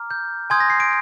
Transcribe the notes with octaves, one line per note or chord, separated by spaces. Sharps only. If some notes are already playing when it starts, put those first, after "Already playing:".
Already playing: A#5 D6 F6
G6
G#5 C6 D#6 G6 G#6
A#6
C7
D7